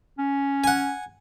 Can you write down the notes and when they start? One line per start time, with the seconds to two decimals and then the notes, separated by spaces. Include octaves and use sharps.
0.18 C#4
0.64 F#5 G#5